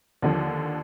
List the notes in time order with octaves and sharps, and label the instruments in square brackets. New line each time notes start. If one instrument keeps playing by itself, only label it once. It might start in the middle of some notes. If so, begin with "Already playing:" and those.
[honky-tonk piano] D#2 D3 F3